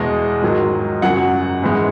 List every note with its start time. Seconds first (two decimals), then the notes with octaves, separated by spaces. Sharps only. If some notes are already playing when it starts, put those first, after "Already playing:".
Already playing: E2 B2 G#3 D#5
0.42 G#2 D#3 F#3
1.02 F#2 C#3 F#3 F#5
1.62 G#2 E3 G#3